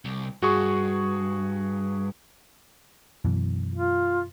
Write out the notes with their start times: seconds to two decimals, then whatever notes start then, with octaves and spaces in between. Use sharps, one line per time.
0.05 C2
0.42 G2 F#4 G#4 C#6
3.25 F#2 B2 E3
3.75 F4